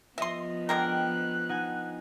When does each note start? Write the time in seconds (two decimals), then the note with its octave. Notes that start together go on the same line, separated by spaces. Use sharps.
0.18 F3 B3 D#5 E5 C6 A#6
0.69 D3 G#3 A#4 G5 F#6
1.49 D#4 F#5 G#5